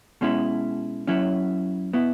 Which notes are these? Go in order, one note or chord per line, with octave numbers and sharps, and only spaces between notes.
B2 G#3 C#4 E4
F#2 F#3 C#4 E4
B2 B3 E4